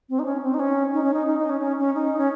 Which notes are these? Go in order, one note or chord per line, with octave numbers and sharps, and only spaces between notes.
C4
D#4
C#4
C4
D#4
C#4
D#4
C#4
D#4
D#4
D#4
C#4
C#4
C#4
D#4
C#4